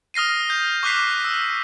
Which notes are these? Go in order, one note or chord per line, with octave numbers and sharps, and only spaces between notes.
D#6 F6 A#6 C7 D#7
D#6 G6
C#6 D6 F6 F#6 B6 C7
E6